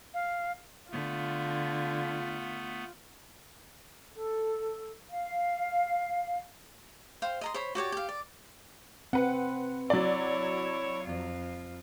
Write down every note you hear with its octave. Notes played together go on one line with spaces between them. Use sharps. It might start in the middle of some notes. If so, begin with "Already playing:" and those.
F5
D3 A3 B3 F4
A4
F5
C5 F5 G5
D#5 A#5 C6
C5 C#5 B5
F#4 G4 C#5 D5
G4 F5
D5
C4 B4 F#5
F#3 E4 C#5 D5
F2 F4